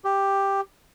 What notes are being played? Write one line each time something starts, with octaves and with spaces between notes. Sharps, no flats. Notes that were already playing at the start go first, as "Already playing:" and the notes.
G4